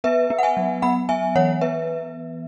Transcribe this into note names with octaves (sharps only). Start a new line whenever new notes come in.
B3 B4 E5
B3
F#5
E5 G#5
F#3
B3 F#5 B5
B3 E5 G#5
E3 C#5 F#5
B3 B4 E5